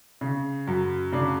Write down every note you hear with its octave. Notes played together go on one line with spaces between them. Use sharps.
C#3
F#2
C#3 D4